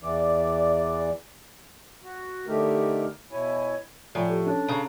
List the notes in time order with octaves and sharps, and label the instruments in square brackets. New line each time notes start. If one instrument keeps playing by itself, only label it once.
[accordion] E2 E3 D5
[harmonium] F#4
D3 A3 D#4 G4 A#4
B2 E4 C#5 G#5
[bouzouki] A2 [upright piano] F3 [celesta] D5 G#5 A#5
[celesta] G4 A4
[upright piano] C#4 [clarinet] D4 [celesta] A4
[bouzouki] C#3 A#5